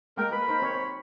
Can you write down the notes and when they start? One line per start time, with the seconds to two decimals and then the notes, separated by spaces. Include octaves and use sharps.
0.17 G#3 A#3 A#4 G5
0.32 A#4 B4 B5
0.48 D#4 A#4 C5
0.62 C4 C#5